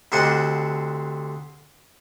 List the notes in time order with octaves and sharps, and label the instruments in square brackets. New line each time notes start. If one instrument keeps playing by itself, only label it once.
[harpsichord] D2 C3 D4 C5 D#5 F#5